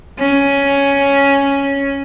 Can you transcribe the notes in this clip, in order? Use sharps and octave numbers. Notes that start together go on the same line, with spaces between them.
C#4